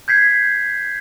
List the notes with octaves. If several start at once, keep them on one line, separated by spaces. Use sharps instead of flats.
G6 G#6 B6 C7